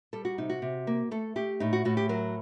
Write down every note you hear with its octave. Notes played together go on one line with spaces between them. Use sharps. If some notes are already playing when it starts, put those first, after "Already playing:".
G3 A4
F#4
C3 D#4
F#4
C3
A#3
A3 A4
A3 G4
A2 D#4
F#4
A2 F#4
G4
F#3 A#4